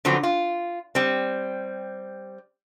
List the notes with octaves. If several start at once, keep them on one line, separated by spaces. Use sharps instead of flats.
D3 F3 F#3 B3 C4
F4
G3 C4